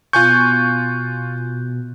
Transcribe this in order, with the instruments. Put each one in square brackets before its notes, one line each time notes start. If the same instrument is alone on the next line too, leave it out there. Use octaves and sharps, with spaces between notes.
[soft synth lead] B2 [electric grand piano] F4 G#5 C#6 [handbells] F#6 G6